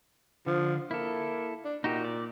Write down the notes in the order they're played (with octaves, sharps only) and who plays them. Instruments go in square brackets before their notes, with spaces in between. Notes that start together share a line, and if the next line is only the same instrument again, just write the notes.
[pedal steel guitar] D3 [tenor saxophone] F3
[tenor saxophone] A#3 [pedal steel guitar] E4 A4
[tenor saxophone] D4
[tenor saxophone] A#2 [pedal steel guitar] D#4 F#4 G4
[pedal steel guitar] D5